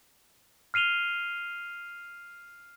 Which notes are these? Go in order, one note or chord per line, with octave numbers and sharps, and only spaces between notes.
F6 C7 D#7 F7 G7